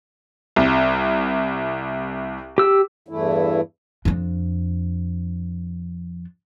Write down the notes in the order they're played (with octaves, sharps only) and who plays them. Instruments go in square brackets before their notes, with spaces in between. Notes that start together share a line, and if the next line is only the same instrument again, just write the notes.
[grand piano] C2
[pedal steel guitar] G4 E6
[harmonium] E2 G2 E3 A3 E4
[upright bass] F2 D4